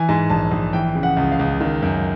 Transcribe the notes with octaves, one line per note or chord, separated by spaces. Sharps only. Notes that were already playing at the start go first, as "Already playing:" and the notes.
Already playing: E3 G#5
G#2
A#1 A5
A#1
E3 G5
C#3
F#5
C#2
F5
C#2
D#3
F#2